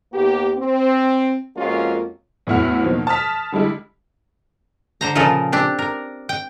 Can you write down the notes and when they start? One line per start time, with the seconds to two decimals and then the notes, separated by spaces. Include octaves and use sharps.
0.13 D#2 A#3 B3 G4
0.58 C4
1.56 F2 G#3 A#3 C#4 F4 F#4
2.47 E2 A2 F#3 E4 F#4 F6
2.82 B2 D#3 F3 F#3 A#3
3.07 A5 D#6 F6 B6
3.52 D3 G3 G#3 E4
5.01 D3 C5 A#5
5.15 A#2 C#3 F3 F4 A4 A#4
5.52 C4 D4 G4
5.79 A#4
6.29 G5